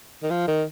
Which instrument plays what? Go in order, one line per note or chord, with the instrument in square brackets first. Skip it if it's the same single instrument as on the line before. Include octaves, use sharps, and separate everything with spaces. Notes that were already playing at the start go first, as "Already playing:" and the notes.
[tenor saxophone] D#3
F3
D#3